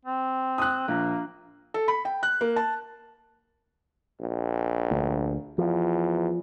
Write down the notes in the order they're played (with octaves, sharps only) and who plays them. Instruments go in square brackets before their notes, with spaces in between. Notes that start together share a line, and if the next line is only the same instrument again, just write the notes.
[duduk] C4
[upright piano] D#6 F#6
[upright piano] A#1 [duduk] A#3
[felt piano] A4
B5
G5
F#6
A#3
A5
[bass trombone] A#1
[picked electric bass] D2
[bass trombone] E2 [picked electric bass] F3